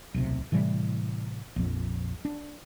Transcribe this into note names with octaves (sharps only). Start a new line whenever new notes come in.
D1 B1 C3
A2 C3 E3 G3
A#1 F2
D4